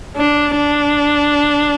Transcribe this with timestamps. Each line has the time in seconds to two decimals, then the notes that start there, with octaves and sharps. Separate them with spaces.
0.17 D4
0.56 D4